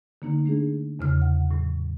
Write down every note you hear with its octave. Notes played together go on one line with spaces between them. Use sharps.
D3 A#3 D#4
A3 D4 G#4
E2 C#3 F6
F#5
A2 F#3